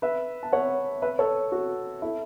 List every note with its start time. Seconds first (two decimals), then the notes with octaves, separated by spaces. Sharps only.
0.02 B4 E5
0.43 A5
0.53 C#5 F#5
1.02 B4 E5
1.19 A4 C#5
1.52 F#4
2.02 E4 A4